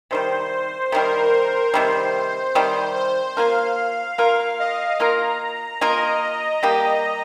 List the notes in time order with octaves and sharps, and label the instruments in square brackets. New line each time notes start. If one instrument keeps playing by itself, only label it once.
[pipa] C3 D#3 G3 [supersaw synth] C5
[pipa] C3 D#3 G3 [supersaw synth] A#4
[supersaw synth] C5
[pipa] C3 D#3 G3 [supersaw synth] C5
[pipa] C3 D#3 G3 [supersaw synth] C5
[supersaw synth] C5
[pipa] A#3 F4 A#4 [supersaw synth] F5
[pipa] A#3 F4 A#4 [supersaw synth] F5
[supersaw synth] D#5
[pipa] A#3 F4 A#4 [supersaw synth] A#5
[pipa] A#3 F4 A#4 [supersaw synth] D#5
[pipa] G3 A#3 G4